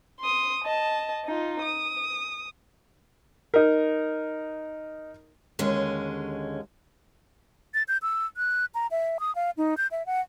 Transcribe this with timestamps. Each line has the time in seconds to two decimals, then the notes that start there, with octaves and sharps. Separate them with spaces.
0.20 C6 D#6
0.64 D#5 A5
1.25 D#4 F4
1.62 D#6
3.54 D#4 A#4
5.59 D#2 D3 G#3 C#4
7.74 A6
7.88 G6
8.02 E6
8.37 F#6
8.75 A#5
8.91 E5
9.20 D#6
9.35 F5
9.57 D#4
9.77 G6
9.91 E5
10.06 F#5